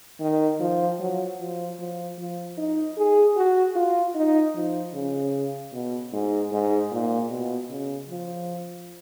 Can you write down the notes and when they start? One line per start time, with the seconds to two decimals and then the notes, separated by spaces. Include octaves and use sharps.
0.20 D#3
0.60 F3
1.00 F#3
1.40 F3
1.79 F3
2.18 F3
2.58 D#4
2.97 G#4
3.37 F#4
3.75 F4
4.15 D#4
4.55 F3
4.94 C#3
5.73 B2
6.13 G#2
6.51 G#2
6.91 A#2
7.31 B2
7.70 C#3
8.09 F3